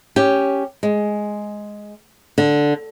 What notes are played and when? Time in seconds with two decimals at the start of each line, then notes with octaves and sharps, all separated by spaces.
0.16 C#4 G4
0.83 G#3
2.38 D3